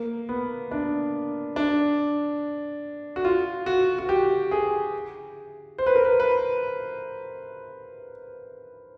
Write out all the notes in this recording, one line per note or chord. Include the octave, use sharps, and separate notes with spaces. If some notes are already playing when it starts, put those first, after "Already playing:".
Already playing: A#3
B3
D4
D4
F#4
F4
F#4
F#4
G4
G#4
C5
B4
A#4
B4
B4